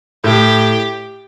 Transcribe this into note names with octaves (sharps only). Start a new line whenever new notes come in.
A2 G4